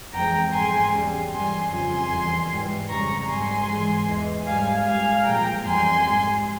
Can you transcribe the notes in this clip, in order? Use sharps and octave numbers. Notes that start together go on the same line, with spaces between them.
F2 E3 G#3 G5 A#5
G#2 F3 G#3 G#5 C6
E2 C#3 G3
G2 E3 G3 G#5 C6
F2 C#3 F3 G#5 C6
E2 E3 G3
G#2 E3 G3
F2 C#3 G3 A#5 C#6
G#2 G3 G#5 C6
G#2 E3 G#3
E2 E3 G#3
G#2 G3 F5 G#5
G#2 G3 F5 G#5
A#2 F3 G#3 G5 A#5
F2 E3 G3 G#5 C6
G#2 G3